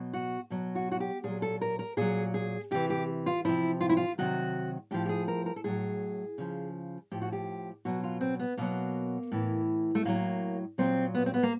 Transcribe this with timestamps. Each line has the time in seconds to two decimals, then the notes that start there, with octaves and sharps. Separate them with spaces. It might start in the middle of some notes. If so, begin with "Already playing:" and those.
Already playing: B2 F#3
0.13 F#4
0.50 B2 F#3
0.75 F#4
0.92 F#4
1.00 G4
1.24 A#2 F#3 G#4
1.42 A4
1.61 A#4
1.79 A#4
1.97 A#2 F#3 G#4
2.34 G#4
2.71 C3 E3 G4
2.90 G4
3.26 F4
3.45 C3 F3 E4
3.81 F4
3.89 E4
3.97 F4
4.18 C3 D#3 F#3 F#4
4.91 A2 F3 G4
5.05 G4
5.09 G#4
5.28 A#4
5.46 A#4
5.56 A4
5.64 A2 F#3 G#4
6.38 C#3 F3
7.11 A2 F3 G4
7.22 F#4
7.32 G4
7.85 B2 F#3 F#4
8.03 F4
8.21 C4
8.39 B3
8.57 B2 F#3 A#3
9.32 A2 E3
9.95 A3
10.05 A2 F#3 A#3
10.78 A#2 F#3 C4
11.14 B3
11.26 C4
11.34 B3
11.43 A#3